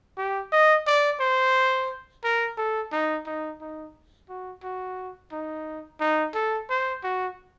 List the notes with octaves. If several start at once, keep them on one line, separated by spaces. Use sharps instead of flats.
G4
D#5
D5
C5
A#4
A4
D#4
D#4
D#4
F#4
F#4
D#4
D#4
A4
C5
F#4